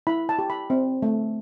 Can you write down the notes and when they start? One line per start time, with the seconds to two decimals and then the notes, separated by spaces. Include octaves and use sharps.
0.07 E4 B5
0.29 A5
0.39 G4
0.50 B5
0.70 C4
1.02 A3